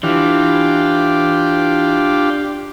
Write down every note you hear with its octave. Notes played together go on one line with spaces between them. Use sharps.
E3 D4 F4 G4